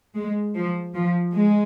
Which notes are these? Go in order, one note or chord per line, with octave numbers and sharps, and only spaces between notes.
G#3
F3
F3
G#3